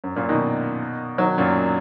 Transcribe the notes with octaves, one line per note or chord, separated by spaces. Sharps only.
F#2
F#2 A#2
B2 D#3
D#3 F#3
F#2 A#2